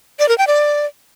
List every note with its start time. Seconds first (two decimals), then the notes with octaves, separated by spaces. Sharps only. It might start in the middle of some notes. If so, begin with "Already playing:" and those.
0.19 D5
0.29 A#4
0.38 G5
0.47 D5